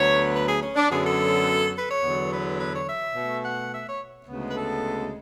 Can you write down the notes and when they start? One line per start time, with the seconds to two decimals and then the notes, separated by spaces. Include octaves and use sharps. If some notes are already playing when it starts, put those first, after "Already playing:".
Already playing: D2 D3 F#3 B3 C#5
0.33 B4
0.46 G#4
0.62 C#4
0.76 D4
0.89 F#2 D3 F#3 B3 G#4
1.04 A4
1.73 B4
1.88 C#5
2.02 E2 D3 F#3 B3
2.30 B4
2.58 B4
2.72 C#5
2.86 E5
3.14 B2 A3
3.43 F#5
3.71 E5
3.85 C#5
4.27 D2 C#3 G#3 B3
4.50 B4
4.55 A4